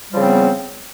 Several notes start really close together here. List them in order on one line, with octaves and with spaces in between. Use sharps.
G3 F3 C#3 C4 B3